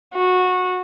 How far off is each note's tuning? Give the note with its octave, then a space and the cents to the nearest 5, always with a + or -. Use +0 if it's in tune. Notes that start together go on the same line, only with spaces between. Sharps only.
F#4 -20